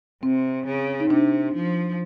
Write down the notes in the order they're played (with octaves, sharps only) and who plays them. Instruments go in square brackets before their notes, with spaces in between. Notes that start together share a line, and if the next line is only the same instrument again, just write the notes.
[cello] C3 [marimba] C4
[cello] C#3
[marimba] D#4
[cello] C3 [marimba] D4
[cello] F3